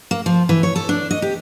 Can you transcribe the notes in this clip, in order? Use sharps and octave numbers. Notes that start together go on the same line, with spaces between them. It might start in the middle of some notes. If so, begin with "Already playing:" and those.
A#3
F3
E3
C#5
A4
D4
D#5
G4